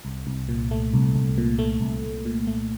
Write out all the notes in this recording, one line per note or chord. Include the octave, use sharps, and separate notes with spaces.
C2
C2
A#2
A3
C2
C2
A#2
A3
C2
C2
A#2
A3